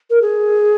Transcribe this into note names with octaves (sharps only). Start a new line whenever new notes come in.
A#4
G#4